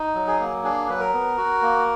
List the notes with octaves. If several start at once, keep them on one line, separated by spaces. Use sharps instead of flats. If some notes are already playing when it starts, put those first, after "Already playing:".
Already playing: D#4
F#3
G#4
A#3
D4 G#4
F#3 B4
A#4
B3
F#4
A#3